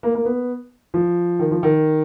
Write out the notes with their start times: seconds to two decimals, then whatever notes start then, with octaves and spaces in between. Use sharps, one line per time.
0.03 A#3
0.15 A#3
0.25 B3
0.94 F3
1.39 D#3
1.51 F3
1.63 D#3